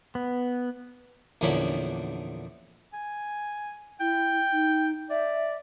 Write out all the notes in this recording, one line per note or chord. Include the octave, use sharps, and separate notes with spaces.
B3
A#1 E2 D3 A#3 C#4 B5
G#5
E4 G5
D#4
D5 E5